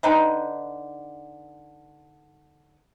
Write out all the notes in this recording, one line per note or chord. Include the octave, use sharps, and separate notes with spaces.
D3 D#4 B4 G5